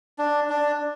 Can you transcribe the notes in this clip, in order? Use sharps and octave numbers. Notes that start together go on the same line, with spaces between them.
D4
D4